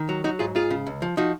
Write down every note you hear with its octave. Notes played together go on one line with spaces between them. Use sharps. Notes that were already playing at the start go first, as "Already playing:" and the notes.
Already playing: D#3
F#3
F#3 D#4 F#4
G#2 F4 G#4
G#2 F4 G#4
C#3
C#2
F3
F3 D#4 F#4